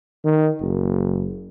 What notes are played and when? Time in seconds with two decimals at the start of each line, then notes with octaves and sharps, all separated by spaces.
0.25 D#3
0.62 F#1